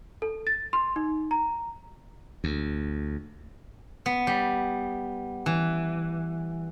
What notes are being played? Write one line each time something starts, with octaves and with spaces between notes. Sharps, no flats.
A4
A6
C6
D#4
A#5
D2
B3
G3
E3